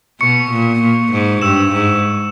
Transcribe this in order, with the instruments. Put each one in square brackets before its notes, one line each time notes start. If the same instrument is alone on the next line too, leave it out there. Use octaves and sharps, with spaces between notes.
[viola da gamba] B2 [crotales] C#6 C#7
[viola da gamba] A#2
A#2
G#2
[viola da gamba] G2 [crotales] E6 E7
[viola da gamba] G#2